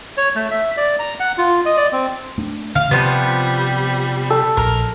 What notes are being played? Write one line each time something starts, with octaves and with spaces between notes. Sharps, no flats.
C#5
A3
E5
D5
A#5
F#5
F4
D#5
D5
C4
A3 D4
D3 F5
C3 F3 G3 B3
A4
A#1 A#4